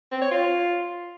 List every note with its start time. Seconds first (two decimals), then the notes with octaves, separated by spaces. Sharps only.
0.12 C4
0.21 C#5
0.31 F4